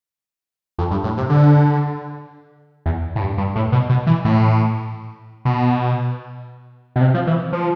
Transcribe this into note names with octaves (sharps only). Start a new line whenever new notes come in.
F2
G2
A2
C3
D3
E2
A2
G2
G2
A2
B2
B2
E3
A2
B2
B2
C3
F3
E3
F3